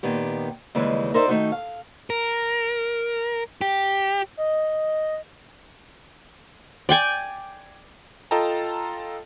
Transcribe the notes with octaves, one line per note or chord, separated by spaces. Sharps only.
A#2 D#3 B3 G4
D#2 C#3 E3 G3 G#3
D#4 A#4 C5 D5 E5
D#3 A3 D#4 F#4
F5
A#4
G4
D#5
D5 G5 G#5
F4 A4 D#5 G5 A5 A#5